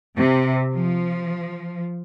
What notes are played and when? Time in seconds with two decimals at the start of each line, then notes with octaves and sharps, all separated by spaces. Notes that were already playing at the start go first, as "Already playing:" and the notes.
0.16 C3
0.73 F3